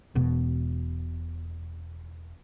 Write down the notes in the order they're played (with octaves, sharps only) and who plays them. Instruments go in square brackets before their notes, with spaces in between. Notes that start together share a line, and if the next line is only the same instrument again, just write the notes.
[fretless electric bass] E1 B2